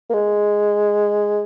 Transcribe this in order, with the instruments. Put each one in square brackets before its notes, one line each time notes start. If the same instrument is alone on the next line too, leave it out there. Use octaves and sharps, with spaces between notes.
[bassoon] A#3
G#3